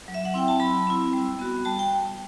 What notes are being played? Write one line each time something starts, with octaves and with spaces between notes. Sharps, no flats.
F#3
E5
F#5
C4 E4 G5
A5
F#3 B5
C4 E4
G3
B3 F#4
G3 A5
G5